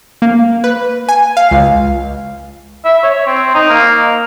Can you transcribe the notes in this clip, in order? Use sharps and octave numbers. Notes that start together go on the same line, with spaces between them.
A#3
B4
G#5
F5
C#2
E5
C#5
C4
D#4
A#3